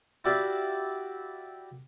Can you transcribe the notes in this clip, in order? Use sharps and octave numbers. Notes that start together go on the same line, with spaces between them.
E4 F#4 G4 D5 E5 F5